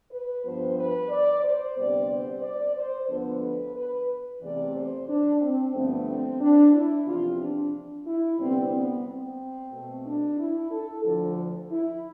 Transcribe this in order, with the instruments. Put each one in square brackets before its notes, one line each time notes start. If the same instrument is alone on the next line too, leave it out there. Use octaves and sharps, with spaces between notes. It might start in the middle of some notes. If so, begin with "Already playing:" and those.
[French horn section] B4
G2 F3 B3 C5
B4
D5
C5
D2 C3 G3 B3 D5
C5
D5
C5
D2 D3 F3 B3 A4
B4
B4
E2 C3 E3 A3 D5
C5
D4
C4
G2 D3 F3 A3 B3
C4
D4
E4
E2 C3 F3 F4
D4
E4
D2 C3 G3 B3 C4
B3
C4
B2 A3
D4
E4
A4
D2 D3 F3
E4